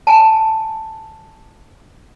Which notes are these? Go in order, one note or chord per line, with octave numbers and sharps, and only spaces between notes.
G#5 A5